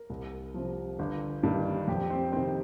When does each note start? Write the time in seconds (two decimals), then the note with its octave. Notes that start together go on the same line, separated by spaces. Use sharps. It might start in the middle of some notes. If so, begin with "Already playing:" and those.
Already playing: A#4
0.10 C2
0.54 C3 F3
0.99 G1
1.43 G2 D#3 G3
1.88 F2 G4
2.10 C4
2.32 C3 D#3 C4